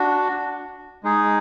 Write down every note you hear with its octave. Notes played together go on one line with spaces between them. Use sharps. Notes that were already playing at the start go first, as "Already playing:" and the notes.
Already playing: D4 F#4
G#3 D#4 G#4